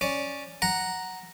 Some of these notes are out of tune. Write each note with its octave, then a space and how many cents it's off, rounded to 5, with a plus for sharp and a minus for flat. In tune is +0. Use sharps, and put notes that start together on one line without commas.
C#4 +0 D5 +0
F#5 +0 A#5 +0